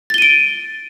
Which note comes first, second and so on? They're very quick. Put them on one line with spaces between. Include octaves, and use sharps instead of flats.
A6 G7 D#7 D7